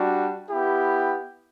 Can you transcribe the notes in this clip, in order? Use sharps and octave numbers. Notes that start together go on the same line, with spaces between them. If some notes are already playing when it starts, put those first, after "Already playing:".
Already playing: G3 D4 F#4
B3 E4 G4